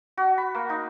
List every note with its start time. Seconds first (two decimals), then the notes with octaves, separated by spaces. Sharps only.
0.17 F#4
0.38 B5
0.55 A#3
0.70 D#4